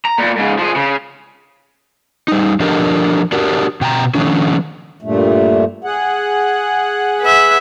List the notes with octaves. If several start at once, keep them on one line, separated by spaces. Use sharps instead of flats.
A#5
A#2 B3
G#2 C#3
F3 G#4
C#3
G3 D#4
F3 D4 G4 A4 A#4 D#5
D4 F#4 G4 A#4
B2 G5 G#5 A#5
D#3 F3 A3 C#4 D4
G2 A#2 A3
G#4 F#5
B4 E5